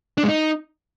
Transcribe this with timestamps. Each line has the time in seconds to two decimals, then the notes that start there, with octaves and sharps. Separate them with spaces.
0.18 D4
0.23 G#3
0.28 D#4